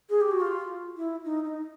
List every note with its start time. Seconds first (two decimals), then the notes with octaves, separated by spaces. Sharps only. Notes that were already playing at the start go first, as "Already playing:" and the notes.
0.09 G#4
0.21 G4
0.31 F#4
0.41 F4
0.96 E4
1.25 D#4
1.44 D#4